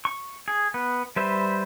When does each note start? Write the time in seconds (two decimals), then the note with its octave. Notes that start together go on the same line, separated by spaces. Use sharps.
0.05 C#6
0.48 G#4
0.74 B3
1.16 G3 B4 C5 E5